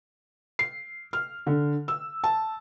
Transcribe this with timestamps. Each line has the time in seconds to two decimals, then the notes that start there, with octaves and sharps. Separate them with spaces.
0.59 C7
1.13 F6
1.47 D3
1.88 E6
2.24 A5